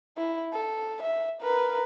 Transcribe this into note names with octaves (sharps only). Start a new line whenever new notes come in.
E4
A4
E5
A#4 B4